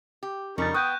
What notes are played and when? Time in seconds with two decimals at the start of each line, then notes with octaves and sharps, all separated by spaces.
0.23 G4
0.58 F2 C#3 G3 C#4 D#4 A#4 C#6 A6
0.74 B3 G5 C#6 D#6 F#6 G6